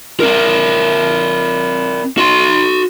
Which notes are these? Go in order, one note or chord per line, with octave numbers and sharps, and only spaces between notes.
C4 A#4
F#4 C6